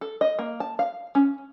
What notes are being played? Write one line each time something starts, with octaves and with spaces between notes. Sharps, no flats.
A4
D#5
A#3
A5
F5
C#4